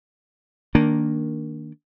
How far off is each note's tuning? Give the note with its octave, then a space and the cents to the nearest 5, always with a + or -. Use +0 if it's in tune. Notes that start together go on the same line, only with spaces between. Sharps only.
D#3 +0 A#3 +0 D4 +0